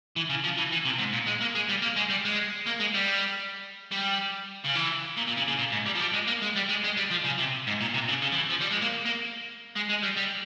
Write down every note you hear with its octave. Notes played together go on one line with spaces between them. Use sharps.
E3
C#3
F3
E3
E3
C3
G#2
A#2
G#3
A#3
G#3
G3
A#3
G#3
G3
G#3
A#3
G#3
G3
G3
C#3
E3
A#2
A#2
C#3
C#3
A#2
G#2
G3
F3
G3
G#3
A#3
G#3
G3
G#3
G#3
G3
F3
C#3
C3
G#2
A#2
C3
C#3
C#3
F3
E3
F3
G3
G#3
A#3
A#3
G#3
G#3
G3
G3